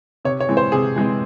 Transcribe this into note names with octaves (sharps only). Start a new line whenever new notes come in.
C3 C#5
C#5
E3 G#3 C4
C5
C3 G#4
E3 G#3 C4